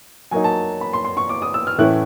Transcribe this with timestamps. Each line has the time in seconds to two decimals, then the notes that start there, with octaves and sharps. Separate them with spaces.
0.31 F#3 A#3 D#4 G#5
0.44 A5
0.81 B5
0.93 C6
1.04 C6
1.17 C#6
1.29 D6
1.42 D#6
1.54 E6
1.67 F6
1.79 A2 E3 A3 C#4 E4 F#6